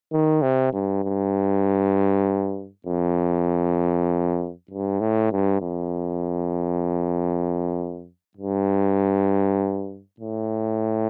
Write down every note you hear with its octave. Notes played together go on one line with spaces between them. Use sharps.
D#3
C3
G2
G2
F2
G2
A2
G2
F2
G2
A2